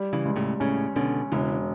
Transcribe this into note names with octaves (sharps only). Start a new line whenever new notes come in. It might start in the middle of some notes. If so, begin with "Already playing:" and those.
Already playing: G3
C#3 E3
C#2
A2 C#3
A2 C#3 C#4
B2 D3 C#4
E1 C#3 E3